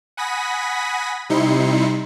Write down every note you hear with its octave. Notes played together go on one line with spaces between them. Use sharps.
F#5 G#5 B5 D#6 A#6 B6
C3 G3 D#4 E4 C6 C#7